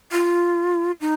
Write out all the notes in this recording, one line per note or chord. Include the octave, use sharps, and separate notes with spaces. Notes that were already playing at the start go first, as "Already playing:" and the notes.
F4
D#4